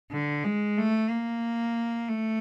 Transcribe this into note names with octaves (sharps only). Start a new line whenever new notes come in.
D3
G#3
A3
A#3
A3